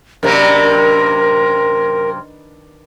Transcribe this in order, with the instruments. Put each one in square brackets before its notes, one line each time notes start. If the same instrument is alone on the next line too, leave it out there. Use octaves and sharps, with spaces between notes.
[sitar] F#2 C3 A#3 [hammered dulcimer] D#3 D4 B4 [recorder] A#4